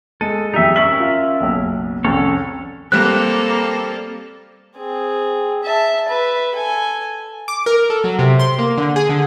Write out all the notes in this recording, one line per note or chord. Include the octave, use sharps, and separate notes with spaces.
G#3 A4 D#7
F2 G3 D#4 E5
C#4 A#4 E5 C#6 A6 F#7
F4
F#1 B1
C2 F2 C#4 A4 C#5
G3 A#3 C4 A4 F#6
C4 G#4
E5 A5
B4 E5
A4 G#5
D6
A#4
A4
F#3
C3
C6
A#3
D3
G#4
D3